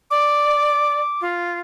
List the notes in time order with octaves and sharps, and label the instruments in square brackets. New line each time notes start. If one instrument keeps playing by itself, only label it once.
[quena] D5 [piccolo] D6
[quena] F4